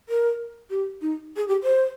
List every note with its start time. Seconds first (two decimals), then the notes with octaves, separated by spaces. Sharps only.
0.09 A#4
0.70 G4
1.02 D#4
1.37 G#4
1.48 G4
1.63 C5